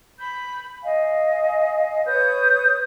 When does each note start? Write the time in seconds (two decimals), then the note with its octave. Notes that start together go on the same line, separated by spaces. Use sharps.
0.18 B5 G6
0.83 D#5 F5 G#5
2.06 B4 C#5 D#6 G6